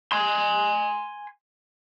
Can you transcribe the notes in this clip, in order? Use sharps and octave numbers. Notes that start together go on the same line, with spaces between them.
G#5 C6